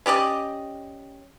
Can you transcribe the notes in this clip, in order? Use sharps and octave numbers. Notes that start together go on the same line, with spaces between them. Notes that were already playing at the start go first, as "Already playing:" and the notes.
C#4 G4 D5 D#5